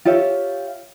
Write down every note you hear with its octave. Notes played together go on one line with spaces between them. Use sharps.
F4 G4 C#5 E5